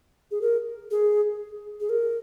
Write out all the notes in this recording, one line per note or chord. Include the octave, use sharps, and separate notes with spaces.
G#4
A#4
G#4
G#4
A#4